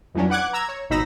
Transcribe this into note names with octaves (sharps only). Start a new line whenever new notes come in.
F2 E3 F#3 C#4 D4
B4 F#5 D6 F#6 G#6
A#5 E6 G#6
C#5
G#1 B2 D#4 B5 E6 A#6